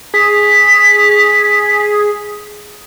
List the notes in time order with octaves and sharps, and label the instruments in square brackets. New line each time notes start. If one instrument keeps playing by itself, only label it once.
[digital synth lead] G#4 [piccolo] B6